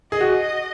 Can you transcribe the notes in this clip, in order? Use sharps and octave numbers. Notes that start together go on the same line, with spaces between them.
G#4 D#5
F#4